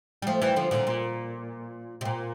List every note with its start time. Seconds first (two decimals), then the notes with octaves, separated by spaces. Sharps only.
0.22 G3
0.27 F3 A3
0.42 E3 G3
0.56 D3 F3
0.71 A#2 D3
0.87 A#2
2.01 C3
2.05 A#2